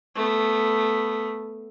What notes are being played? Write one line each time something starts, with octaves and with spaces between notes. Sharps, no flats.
A3 B3